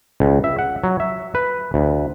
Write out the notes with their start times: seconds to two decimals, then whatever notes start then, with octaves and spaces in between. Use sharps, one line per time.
0.20 C#2
0.44 E5
0.59 F#5
0.84 F#3
1.00 E5
1.35 B4
1.74 D2